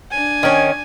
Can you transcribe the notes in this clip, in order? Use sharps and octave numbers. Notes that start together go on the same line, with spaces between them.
D4 G#5
D#3 C#4